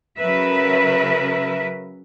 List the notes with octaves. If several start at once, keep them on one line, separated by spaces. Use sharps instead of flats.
C#3 F#3 A#4 B4 E5